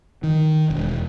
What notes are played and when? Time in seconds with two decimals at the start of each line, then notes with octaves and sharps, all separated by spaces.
0.23 D#3
0.70 E1